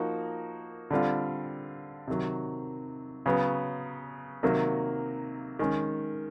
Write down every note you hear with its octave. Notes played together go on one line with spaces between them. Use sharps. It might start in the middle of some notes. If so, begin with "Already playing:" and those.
Already playing: F3 A#3 D#4 F#4
D3 G3 C4 F4
C3 D#3 F#3
C#3 F#3 B3
C3 D#3 F#3 A#3
D#3 G#3 C#4